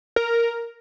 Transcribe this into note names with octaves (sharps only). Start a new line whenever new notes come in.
A#4